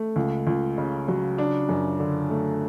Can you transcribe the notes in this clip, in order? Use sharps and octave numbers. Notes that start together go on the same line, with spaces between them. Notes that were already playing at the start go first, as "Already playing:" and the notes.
Already playing: A3
C#2
C#2
C#3
F#3
D4
F#2
D3
A3